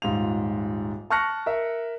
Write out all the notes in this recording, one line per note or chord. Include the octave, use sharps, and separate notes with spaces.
D#1 G#2 F4 F7
A5 C#6 F6 F#6 A#6 C#7
A#4 E5